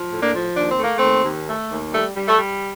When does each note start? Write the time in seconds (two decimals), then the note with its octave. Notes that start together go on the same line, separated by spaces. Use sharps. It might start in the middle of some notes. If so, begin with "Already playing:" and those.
Already playing: F3
0.11 A2
0.22 A#3 D4
0.34 F3
0.56 D#2 D4
0.70 C4
0.79 A3 A#3
0.98 D#2 A3 C4
1.25 D#2
1.48 A3
1.70 D#2
1.93 G3 A3
2.16 G3
2.27 A3
2.38 G3